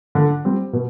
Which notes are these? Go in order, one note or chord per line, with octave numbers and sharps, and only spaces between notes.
D3
G3 C4
B2